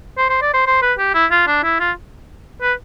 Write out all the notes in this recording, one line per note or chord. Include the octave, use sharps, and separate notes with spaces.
C5
C5
D5
C5
C5
B4
G4
E4
F4
D4
E4
F4
B4